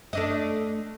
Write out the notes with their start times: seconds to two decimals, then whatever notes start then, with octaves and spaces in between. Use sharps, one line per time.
0.13 A3 D4 D#5